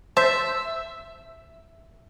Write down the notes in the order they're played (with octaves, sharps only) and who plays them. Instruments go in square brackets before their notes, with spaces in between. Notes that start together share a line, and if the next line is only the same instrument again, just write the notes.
[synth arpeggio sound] C5 A5 [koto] E5